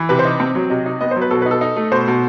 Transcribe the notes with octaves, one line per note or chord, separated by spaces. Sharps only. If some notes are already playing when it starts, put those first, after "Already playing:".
Already playing: E3
C3 B4
C5
D#4
C4
F#3
C3 D#5
D#4
B3 D#5
C5
F#3
B4
B2 A4
D#4 B4
A4
D#4
A3
B2 C5
B2